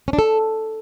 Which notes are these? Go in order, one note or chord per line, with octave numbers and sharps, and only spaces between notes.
C#4
D4
A4